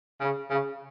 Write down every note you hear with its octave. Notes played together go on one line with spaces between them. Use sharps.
C#3
C#3